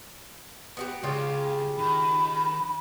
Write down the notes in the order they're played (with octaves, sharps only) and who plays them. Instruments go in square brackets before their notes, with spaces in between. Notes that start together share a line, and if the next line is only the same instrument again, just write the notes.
[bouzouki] B3 F#4 G4
[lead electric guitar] C#2 [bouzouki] C#3 F4 G4
[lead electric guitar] D#3 [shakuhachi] B5